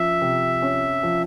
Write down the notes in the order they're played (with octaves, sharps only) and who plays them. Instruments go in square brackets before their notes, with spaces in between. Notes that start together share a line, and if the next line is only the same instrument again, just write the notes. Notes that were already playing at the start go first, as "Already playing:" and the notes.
Already playing: [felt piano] F3 C#4 [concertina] E5
[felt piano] C3
C#4
F3